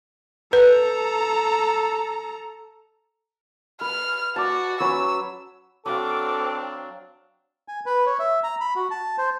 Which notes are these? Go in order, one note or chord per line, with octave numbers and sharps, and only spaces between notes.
A4 B4 A#5
B4 F6
F#4 D5 A5
F#3 C#4 B4 E6
F#3 C4 D4 A4 C5 F5 D6
G#5
B4
C#5
E5
A#5
B5
F#4
A5
C5